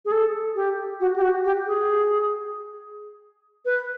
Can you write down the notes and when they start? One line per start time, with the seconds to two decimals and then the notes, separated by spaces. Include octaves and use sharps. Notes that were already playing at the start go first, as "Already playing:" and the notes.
0.05 G#4
0.12 A4
0.55 G4
1.00 F#4
1.16 G4
1.22 F#4
1.44 G4
1.66 G#4
3.65 B4